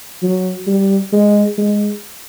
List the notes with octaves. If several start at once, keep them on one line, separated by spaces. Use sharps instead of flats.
F#3
G3
G#3
G#3